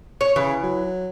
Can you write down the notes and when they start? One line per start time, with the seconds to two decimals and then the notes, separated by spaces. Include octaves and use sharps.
0.21 C#5
0.36 C#3 E3
0.63 F#3